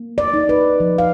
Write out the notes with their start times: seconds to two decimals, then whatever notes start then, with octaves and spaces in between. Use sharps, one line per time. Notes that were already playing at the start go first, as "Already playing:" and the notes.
Already playing: A#3
0.18 D5
0.34 D#4
0.49 B4
0.80 F3
0.98 F5